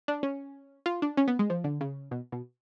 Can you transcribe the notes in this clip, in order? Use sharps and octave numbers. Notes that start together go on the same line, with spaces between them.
D4
C#4
F4
D4
C#4
B3
G#3
F3
D3
C#3
B2
B2